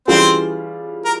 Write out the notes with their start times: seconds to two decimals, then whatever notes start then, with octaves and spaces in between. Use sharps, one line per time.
0.08 E3 G3 C4 C#4 F4 G#4 C5
1.05 A#4